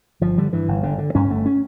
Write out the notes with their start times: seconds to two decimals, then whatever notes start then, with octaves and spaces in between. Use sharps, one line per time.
0.21 G1 F3
0.38 D3 G3
0.53 G2 E3
0.68 G1
0.83 G1 D3
0.98 D3
1.15 G2 C#4
1.30 G1 A3
1.46 C#4